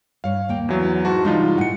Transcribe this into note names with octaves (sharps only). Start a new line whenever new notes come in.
G2 C#5 F5
D#2 A#3 G5
E2 F#3 E4
G#2 F#4 A5
G2 C3 E3 G#3 D#4 F4
A2 F#5 G#5 C#7